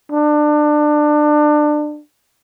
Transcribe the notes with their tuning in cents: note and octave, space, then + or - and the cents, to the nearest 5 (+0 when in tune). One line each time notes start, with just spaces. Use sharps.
D4 +25